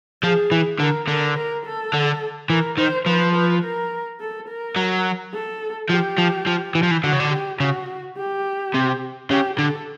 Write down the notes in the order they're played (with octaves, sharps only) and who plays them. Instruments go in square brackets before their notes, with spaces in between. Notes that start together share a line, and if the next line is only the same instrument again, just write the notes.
[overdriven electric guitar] F3 [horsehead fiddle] G#4
[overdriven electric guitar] E3
[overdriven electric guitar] D3 [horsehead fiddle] A#4
[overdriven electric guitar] D3 [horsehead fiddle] A#4
[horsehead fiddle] A#4
A4
[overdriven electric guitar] D3
[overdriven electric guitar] E3 [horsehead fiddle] A#4
[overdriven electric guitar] D#3 [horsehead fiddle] C5
[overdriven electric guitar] F3 [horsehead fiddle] B4
[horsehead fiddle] B4
A#4
A4
A#4
[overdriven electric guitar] F#3
[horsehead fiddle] A4
[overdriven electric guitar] F3 [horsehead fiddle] G4
[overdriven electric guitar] F3
F3
E3
F3
E3
[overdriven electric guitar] D3 [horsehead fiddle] F#4
[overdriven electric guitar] C#3
D3
[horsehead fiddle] G4
[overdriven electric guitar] C#3 [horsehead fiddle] F#4
[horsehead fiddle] G4
[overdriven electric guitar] C3
[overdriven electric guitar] C#3 [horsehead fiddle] G4
[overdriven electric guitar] D3 [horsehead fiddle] A4